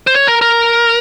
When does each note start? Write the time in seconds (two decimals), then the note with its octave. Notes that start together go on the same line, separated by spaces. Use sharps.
0.07 C5
0.15 C#5
0.28 A#4
0.41 A#4